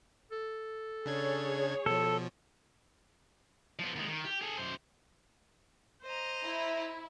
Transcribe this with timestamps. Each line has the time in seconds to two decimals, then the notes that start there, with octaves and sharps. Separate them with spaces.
0.31 A4
1.06 C#3 D4 G#4 C#5 G#6
1.86 B2 F3 A4
3.79 F3 B3
3.96 D#2 G#3
4.08 D#3
4.25 G4
4.41 G#4 A4
4.57 F#2 C5
6.02 C5 D#5 A#5
6.44 E4